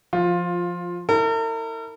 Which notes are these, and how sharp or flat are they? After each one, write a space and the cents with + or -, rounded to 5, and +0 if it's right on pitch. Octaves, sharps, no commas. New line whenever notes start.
F3 +0 F4 +15
E4 -35 A#4 -45